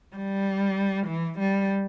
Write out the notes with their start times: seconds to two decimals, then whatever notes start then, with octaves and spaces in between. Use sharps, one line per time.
0.16 G3
1.07 E3
1.39 G3